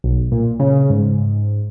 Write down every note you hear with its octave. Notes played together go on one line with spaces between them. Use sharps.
B1
A#2
C#3
G#2